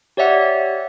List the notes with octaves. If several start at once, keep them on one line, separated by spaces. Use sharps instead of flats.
G4 C#5 D5 E5 F#5